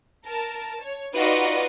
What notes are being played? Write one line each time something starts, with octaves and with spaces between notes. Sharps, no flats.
A#4 A5
C#5
D#4 F4 F#4 B4 D5 D#5